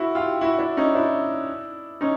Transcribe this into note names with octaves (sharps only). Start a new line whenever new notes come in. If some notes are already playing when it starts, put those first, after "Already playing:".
Already playing: E4 F#4
F4 G4
E4 F#4
D4 E4
C#4 D#4
D4 E4
C#4 D#4